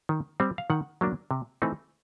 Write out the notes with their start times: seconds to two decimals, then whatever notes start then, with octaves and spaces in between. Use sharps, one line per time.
0.09 D#3
0.40 G3 C4
0.58 F5
0.70 D#3 F#5
1.01 F#3 A#3 D4
1.31 C3
1.62 E3 A3 C4 D#4